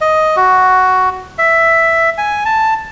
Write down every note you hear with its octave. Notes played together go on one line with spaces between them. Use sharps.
D#5
F#4
E5
G#5
A5